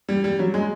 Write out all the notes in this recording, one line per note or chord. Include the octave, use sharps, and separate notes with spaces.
G3
G3
F#3
G#3